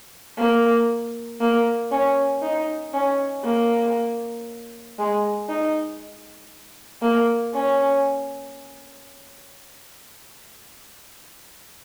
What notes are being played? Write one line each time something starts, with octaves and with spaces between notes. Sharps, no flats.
A#3
A#3
C#4
D#4
C#4
A#3
G#3
D#4
A#3
C#4